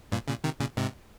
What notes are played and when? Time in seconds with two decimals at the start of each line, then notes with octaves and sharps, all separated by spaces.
0.12 G2 A#2
0.28 A#2 C#3
0.44 C3 D#3
0.60 A#2 C#3
0.77 G#2 C3